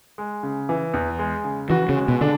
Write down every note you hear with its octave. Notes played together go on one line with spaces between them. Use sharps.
G#3
C#3
E3
E2
G#3
C#3
E3 F#4
C#3
G#3
B2
D3 D4